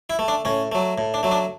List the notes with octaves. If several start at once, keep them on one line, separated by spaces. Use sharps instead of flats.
E4
A3
D4
A2 C#4
F#3 A3
A2
D4
F#3 A3
D4